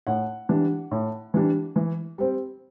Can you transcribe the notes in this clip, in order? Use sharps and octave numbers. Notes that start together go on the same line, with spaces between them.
A2 F#5
E3 G3 D4
A2
E3 G3 D4
E3
G3 C4